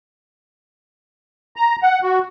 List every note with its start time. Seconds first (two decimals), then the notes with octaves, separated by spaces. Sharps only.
1.56 A#5
1.83 F#5
2.03 F#4